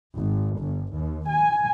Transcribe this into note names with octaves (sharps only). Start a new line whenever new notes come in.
G#1
G1
D#2
G#5